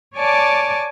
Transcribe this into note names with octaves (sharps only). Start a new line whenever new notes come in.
C#5 D5 G#5 A5 D6